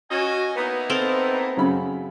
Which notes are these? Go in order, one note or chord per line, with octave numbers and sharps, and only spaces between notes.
C#4 F#4 D#5 G#5
A#3 B3 D#4 E4
C4 A4 A#4
F#2 C#3 B5